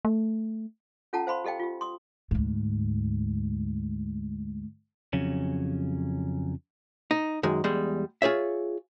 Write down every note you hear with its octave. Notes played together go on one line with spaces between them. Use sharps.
A3
C#4 F4 A4 F#5 A5 A#5
C5 F5 B5 C6
G4 A4 D#5 F5 G5
F4 G4
C6 D#6
D2 G#2
F2 C#3 F#3 C#4
D#4
F#2 D#3 G#3
E2 G3 G#3
F4 G#4 C#5 E5